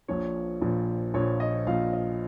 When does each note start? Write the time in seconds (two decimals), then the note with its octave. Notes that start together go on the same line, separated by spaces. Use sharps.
0.08 A#1 A#2 F3 C#5
0.61 A#1 A#2 F3
1.14 A#1 A#2 F3 C#5
1.40 D#5
1.67 A#1 A#2 F3 F5
1.93 D#5